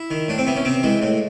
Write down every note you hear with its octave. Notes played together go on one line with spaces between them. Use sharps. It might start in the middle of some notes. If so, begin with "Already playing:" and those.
Already playing: E4
D#3
A2 D4
C4
E3 B3
C#4
C3 C4
E3 G#3
A2